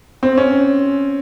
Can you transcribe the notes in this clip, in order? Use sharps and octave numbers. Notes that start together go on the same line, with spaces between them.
C4
C#4